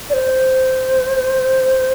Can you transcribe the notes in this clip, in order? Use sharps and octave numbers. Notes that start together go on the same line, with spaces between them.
D5
C5